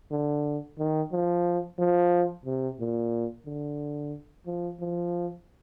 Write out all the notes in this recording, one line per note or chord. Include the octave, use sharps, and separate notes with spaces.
D3
D#3
F3
F3
C3
A#2
D3
F3
F3